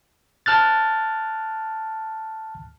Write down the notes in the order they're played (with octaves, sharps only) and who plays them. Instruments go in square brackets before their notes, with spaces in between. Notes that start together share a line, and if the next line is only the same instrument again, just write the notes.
[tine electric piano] A5 F6 F#6 A6